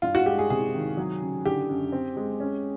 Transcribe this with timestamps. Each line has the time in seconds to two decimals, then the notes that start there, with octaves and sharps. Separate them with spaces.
0.02 G2 F4
0.15 F#4
0.26 G#3 G4
0.39 G#4
0.50 C3 G#4
0.74 D#3
0.97 F#3
1.21 C#3
1.45 D3 G4
1.69 F#2
1.92 C4
2.16 G#3
2.40 C#4